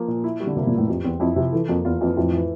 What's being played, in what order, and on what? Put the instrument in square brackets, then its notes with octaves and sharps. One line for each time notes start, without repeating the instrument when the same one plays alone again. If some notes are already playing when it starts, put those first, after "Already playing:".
Already playing: [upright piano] F3 A#3
A#2
E4
G3
[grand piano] D3
[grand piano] C3 [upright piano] A#3
[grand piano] A#2
[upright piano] E3
[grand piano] A2
[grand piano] F2 [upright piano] G4
[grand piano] E2 [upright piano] C4
[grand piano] F2 [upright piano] E4
[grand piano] C3 [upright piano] F3
[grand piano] E3 [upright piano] A4
[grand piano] F2 [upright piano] A#3
[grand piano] E2 [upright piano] F4
[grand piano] F2 [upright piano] E3
[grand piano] F2 [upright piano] A2
[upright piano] E3